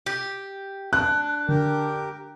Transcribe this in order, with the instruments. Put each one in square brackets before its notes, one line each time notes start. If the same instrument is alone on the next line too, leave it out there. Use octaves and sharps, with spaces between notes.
[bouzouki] G4
[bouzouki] D4 [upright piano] F#6
[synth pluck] D3 [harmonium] G4 A#4 G5